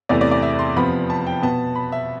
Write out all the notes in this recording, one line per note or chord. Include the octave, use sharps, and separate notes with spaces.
E2 C3 E3 A3 D5
D5
D5
E5
C6
F2 C3 F3 B3 B5
A5
G5
B2 B3 A5
B5
E5